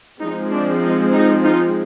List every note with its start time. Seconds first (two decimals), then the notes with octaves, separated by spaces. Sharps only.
0.19 F3 G#3 C4 D#4
0.51 D4
0.82 D#4
1.13 D#4
1.44 D#4 F4